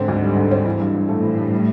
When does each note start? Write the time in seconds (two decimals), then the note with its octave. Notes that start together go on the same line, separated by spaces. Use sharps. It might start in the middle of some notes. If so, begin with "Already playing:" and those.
Already playing: G#2 D3 C4
0.08 D2
0.23 G3
0.36 D3
0.51 C4
0.65 E3
0.80 G2
0.95 G2
1.09 A2 A3
1.23 E3
1.38 G2
1.51 G3